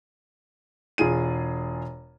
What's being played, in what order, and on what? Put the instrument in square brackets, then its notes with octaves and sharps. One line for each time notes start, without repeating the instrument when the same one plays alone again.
[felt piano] E1 F4 G#4 D#7